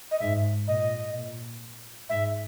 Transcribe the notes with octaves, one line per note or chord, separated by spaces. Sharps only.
D#5
G#2 E5
A#2 D#5
A#2
G#2 E5